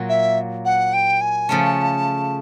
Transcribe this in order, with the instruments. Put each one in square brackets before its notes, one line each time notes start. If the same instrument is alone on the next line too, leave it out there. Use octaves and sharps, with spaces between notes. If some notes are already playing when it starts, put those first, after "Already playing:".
Already playing: [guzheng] A#2 F#3 A#3
[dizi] E5
F#5
G5
G#5
[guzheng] C#3 F3 A3 C#4 [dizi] A5